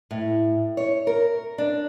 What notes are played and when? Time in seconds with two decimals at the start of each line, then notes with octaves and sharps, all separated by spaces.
0.11 A2
0.77 C#5
1.07 A#4
1.58 D4